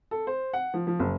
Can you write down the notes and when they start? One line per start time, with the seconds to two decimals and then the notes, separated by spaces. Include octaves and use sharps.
0.11 A4
0.27 C5
0.54 F#5
0.74 F3
0.87 F3
1.00 F#1